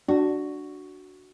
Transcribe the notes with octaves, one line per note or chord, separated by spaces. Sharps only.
D4 F#4